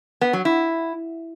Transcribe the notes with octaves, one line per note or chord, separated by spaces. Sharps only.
B3
F#3
E4